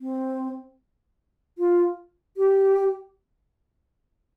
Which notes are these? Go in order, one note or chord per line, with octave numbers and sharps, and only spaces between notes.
C4
F4
G4